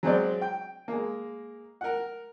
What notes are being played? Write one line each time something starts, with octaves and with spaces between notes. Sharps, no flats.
F#3 G#3 C4 C5 D5
G5
G#3 A#3
A#4 F#5